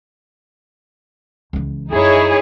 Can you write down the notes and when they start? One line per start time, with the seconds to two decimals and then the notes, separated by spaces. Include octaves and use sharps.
1.53 C#2 E3
1.93 F#2 D#4 E4 G#4 C#5